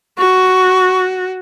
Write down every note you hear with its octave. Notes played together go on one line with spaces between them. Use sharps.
F#4 C#6